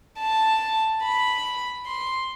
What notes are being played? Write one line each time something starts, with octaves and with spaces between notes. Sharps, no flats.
A5
B5
C6